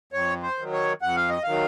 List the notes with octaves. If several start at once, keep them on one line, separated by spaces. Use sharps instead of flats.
F2 C#5
C5
D#3 F#3
C#5
F2 F#5
F5
D#5
D#3 F#3 F5